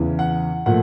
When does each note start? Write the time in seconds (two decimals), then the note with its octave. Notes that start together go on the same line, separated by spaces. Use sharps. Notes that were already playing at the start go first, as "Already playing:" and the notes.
Already playing: E2 C#3 E3
0.19 F#5
0.66 A#2 F3 A3 F#5